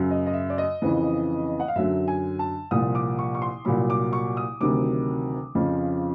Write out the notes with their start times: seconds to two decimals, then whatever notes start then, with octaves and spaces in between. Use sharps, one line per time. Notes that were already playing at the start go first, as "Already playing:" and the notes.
Already playing: F#2 C#3 F#3
0.10 D#5
0.26 D#5
0.33 E5
0.50 D5
0.58 D#5
0.82 F2 C#3 E3
1.60 F#5
1.68 F5
1.76 F#2 D3 F#3 E5
2.08 G#5
2.39 A5
2.71 C2 A#2 F3 D#6
2.95 D6
3.19 C#6
3.35 C#6
3.42 C6
3.65 C2 A#2 F#3 B5
3.90 D6
4.13 C#6
4.37 D#6
4.60 D2 C3 D#3 F#3 D6
5.55 F2 C#3 F3